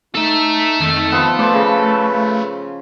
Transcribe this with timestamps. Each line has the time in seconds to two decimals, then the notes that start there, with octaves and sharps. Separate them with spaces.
0.15 D#4 A4 E5
0.80 F2 D#3
1.12 F3 B3
1.39 A3 B4 C5 D5
1.53 C#3